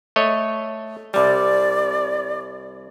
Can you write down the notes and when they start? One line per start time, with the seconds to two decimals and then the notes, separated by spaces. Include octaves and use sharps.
0.16 A3 C#5 D#5
1.14 C2 G3 D5